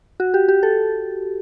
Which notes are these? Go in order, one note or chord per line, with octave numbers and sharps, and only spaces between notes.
F#4
G4
G4
A4